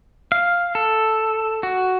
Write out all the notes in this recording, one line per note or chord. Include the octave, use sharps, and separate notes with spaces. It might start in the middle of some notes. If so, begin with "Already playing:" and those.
F5
A4
F#4